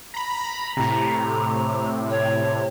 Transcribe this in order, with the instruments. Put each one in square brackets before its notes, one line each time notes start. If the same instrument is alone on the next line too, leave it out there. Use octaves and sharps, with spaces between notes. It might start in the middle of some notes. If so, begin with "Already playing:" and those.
[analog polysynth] A#5 B5
[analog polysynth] A2 C3 [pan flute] A#5
[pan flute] C#5